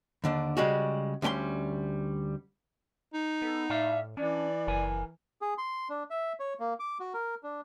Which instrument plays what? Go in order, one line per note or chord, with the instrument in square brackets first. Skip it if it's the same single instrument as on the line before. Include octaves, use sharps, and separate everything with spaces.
[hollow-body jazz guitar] D#2 D3 D4
C#3 G3 G#3 F#4
D2 G3 C#4 G5 C6
[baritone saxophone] D#4
[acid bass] B3 [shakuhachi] A4
[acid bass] A2 [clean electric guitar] D5 F5 [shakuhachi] E5
[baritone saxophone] E3 [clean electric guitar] C#4 [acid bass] D4 [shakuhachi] D5
[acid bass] F#1 [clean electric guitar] A#4 G#5
[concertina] G#4
C6
D4
E5
C#5
A#3
D6
F#4
A#4
D4